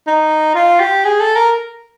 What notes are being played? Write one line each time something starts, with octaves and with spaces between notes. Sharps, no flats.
D#4
F4
G4
G#4
A4
A#4